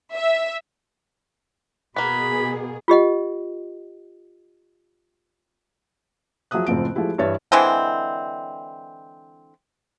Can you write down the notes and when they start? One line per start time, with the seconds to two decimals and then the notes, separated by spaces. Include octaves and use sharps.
0.14 E5
1.96 B2 A#3 B3 G#4 B5
2.88 F4 G4 D#5 F#5
6.51 F3 F#3 G#4 E5 D#6 F#6
6.67 F#1 A2 F3 C4 D7
6.95 F3 G#3 A3 E4 G4
7.18 G2 E3 C#5 E5 A6
7.52 D3 E3 G#3 C4